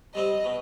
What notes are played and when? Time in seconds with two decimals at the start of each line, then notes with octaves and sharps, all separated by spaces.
0.14 G3 C4 D#5
0.44 B2